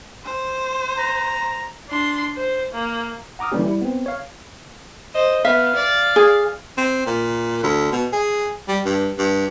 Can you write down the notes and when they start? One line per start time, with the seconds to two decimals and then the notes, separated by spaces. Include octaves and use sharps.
0.25 C5
0.97 A#5
1.90 D4 C6
2.36 C5
2.73 A#3
3.39 F#5 A#5 D6 D#6 F6
3.52 D3 E3 G3 A#3 C#4 G4
3.65 G3 E4
3.81 B3 C4
4.06 C#5 F5
5.15 C5 D#5
5.45 B3 E5 F5
5.75 D5
6.16 G#4
6.77 C4
7.06 A#2
7.63 D2
7.92 B2
8.13 G#4
8.68 G3
8.85 G2
9.18 G2